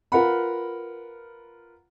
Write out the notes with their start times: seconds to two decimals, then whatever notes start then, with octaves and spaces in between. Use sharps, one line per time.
0.12 F4 A#4 B4 F#5 B5